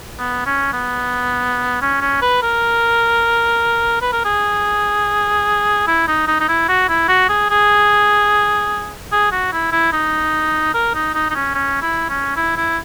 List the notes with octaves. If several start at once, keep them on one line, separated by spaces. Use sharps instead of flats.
B3
C#4
B3
C#4
C#4
B4
A#4
B4
A#4
G#4
E4
D#4
D#4
D#4
E4
F#4
E4
F#4
G#4
G#4
G#4
F#4
E4
E4
D#4
A#4
D#4
D#4
D#4
C#4
C#4
E4
C#4
E4
E4